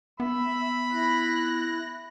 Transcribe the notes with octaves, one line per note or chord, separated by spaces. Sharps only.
B3 E5 B5
E4 F#6 A#6